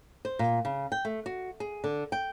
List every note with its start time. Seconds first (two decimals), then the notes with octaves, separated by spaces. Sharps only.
0.25 C5
0.39 A#2
0.65 C#3
0.92 G5
1.05 A3
1.26 F#4
1.60 G#4
1.84 D3
2.12 G5